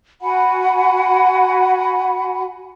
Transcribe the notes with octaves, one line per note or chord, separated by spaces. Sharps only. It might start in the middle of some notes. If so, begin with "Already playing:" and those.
F#4 F#5 G#5 B5